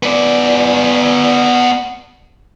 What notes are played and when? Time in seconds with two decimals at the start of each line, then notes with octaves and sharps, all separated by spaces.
0.03 B3 D5